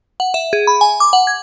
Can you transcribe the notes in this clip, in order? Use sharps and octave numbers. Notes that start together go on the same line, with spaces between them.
F#5
E5
G#4
B5
G#5
D6
F#5
G#6